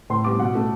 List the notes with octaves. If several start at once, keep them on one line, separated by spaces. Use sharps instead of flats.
A2 C6
G3 B3 D6
B2 F#5
A3